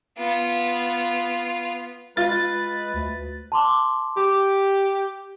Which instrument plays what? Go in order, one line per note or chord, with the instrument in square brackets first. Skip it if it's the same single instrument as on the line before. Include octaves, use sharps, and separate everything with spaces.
[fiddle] B3 F4
[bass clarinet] G#3 [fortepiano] F4 [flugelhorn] B4 [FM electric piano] A6
[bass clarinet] D2
[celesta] A5 C6 D6
[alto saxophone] G4 [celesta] D6